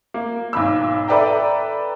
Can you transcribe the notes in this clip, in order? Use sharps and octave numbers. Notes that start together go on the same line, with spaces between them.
A#3
B1 G#2 D#3 B5 D6 E6
A4 B4 D5 E5 G5 A#5